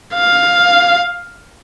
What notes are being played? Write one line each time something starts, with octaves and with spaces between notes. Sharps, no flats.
F5